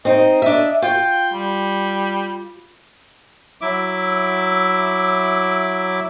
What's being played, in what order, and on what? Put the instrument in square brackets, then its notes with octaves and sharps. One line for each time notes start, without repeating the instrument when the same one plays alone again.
[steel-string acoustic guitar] C4 D#4 [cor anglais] D#5
[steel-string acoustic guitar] D4 E5
[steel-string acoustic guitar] F4 [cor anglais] G5
[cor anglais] G3
[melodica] F#3 E4 E5 D6